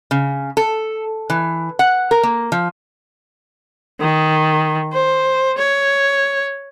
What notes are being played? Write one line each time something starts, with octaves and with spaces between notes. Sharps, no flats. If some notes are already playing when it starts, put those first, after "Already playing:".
C#3
A4
E3
F#5
A#4
A#3
F3
D#3
C5
C#5